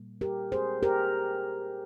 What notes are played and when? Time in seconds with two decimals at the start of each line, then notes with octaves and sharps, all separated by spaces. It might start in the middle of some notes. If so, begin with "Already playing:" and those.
Already playing: A#2 G3 A#3
0.21 G4 A#4
0.52 G#4 C5
0.83 G4 A#4